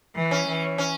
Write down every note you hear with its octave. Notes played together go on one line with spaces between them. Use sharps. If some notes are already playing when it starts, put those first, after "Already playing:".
E3
C#4
E3
C#4